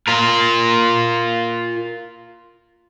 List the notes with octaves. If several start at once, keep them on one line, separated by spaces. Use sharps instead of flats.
F4 A#4